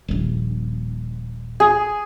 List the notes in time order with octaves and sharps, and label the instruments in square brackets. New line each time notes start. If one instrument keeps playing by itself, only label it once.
[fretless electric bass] D#1 A#1
[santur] G#4